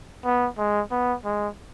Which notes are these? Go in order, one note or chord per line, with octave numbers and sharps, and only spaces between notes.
B3
G#3
B3
G#3